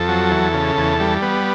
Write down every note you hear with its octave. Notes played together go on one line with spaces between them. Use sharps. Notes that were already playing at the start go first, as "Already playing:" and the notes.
Already playing: F2 A4
F#3
E2
C#3
E2
G3
B3